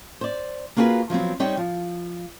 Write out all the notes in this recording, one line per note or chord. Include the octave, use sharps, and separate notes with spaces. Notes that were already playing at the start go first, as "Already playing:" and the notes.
C5 D5
A#3 F4 F#4 G#4 A4 B4
F3 F#3 B3 C4
G3 C4 D#4 C#5 G5
F3